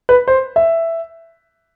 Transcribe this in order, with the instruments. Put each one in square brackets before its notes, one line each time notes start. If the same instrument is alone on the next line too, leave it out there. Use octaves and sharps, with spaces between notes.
[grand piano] B4
C5
E5